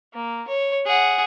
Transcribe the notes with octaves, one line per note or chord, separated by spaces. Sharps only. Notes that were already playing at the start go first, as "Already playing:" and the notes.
A#3
C#5
G#4 F#5